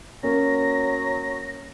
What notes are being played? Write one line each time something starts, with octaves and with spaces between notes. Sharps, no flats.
F#3 A#3 C#4 A#6